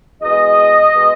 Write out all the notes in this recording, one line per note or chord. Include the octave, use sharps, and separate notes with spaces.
E2 B2 G#3 D#5
B2 G#3